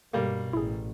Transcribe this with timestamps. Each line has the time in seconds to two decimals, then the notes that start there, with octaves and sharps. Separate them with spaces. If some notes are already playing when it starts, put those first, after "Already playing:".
0.13 G2 B2 G3 A#3
0.53 A1 E4 G#4